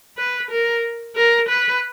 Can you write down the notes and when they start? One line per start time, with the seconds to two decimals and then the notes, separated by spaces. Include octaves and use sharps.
0.18 B4
0.51 A#4
1.16 A#4
1.49 B4